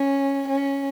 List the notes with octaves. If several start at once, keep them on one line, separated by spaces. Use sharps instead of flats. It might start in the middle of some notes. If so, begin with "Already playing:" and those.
Already playing: C#4
C#4